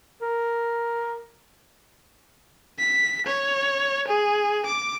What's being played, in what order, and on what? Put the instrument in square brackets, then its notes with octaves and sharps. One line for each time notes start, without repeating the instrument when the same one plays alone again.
[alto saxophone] A#4
[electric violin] B6
C#5
G#4
D6